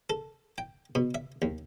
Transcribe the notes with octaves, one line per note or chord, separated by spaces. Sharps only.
A4
G5
B2
E5
D#2